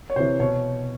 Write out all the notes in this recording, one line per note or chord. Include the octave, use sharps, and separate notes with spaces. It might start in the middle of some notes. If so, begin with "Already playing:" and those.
C#5
C3 E3 C5
B2 C#5